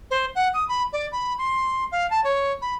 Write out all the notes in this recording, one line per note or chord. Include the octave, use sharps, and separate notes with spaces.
C5
F#5
D#6
B5
D5
B5
C6
F5
A5
C#5
B5